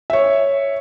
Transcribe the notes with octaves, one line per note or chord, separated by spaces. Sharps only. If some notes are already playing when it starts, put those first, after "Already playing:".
C#5 E5